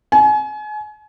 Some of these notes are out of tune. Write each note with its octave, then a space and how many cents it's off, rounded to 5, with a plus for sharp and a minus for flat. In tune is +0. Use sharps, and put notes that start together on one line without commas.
G#5 +35